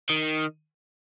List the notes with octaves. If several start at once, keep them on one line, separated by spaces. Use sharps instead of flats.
D#3